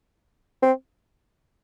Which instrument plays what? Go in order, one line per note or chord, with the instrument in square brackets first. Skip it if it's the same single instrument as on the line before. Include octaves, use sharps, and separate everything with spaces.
[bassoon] C4